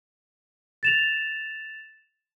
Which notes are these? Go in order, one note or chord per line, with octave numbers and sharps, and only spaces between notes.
A6 E7 F7